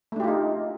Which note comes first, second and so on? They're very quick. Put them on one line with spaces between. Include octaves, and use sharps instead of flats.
A3 D4 G4 F4 D#4